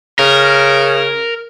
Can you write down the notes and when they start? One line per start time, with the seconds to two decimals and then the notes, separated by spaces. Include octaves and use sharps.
0.19 C#3 A#4